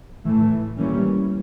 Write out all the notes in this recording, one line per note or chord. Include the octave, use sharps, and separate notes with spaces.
A2 E3 A3
E3 G3 A#3 C#4